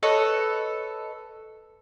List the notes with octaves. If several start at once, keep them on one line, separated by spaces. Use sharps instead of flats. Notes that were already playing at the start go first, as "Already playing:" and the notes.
A4 B4 C#5 D#5